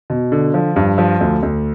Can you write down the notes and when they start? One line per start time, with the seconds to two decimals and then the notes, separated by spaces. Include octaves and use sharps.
0.10 B2
0.32 D3
0.54 F3
0.76 G2
0.98 F3
1.21 D2
1.43 D2